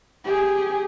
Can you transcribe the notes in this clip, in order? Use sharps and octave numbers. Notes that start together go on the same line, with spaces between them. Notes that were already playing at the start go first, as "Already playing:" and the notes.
G4 G#4